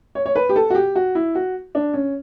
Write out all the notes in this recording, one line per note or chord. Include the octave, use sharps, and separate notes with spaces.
C#5
C#5
B4
G4
A4
F#4
G4
F#4
E4
F#4
D4
C#4